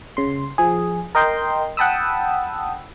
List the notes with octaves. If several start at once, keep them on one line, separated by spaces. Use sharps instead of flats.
C#3 C6
F3 G#4
A#4 D#5 G5 C6 G6
F#5 G5 A5 B5 D#6 E6